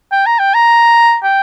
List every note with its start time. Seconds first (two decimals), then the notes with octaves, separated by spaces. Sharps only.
0.12 G5
0.26 A#5
0.39 G5
0.54 A#5
1.24 G5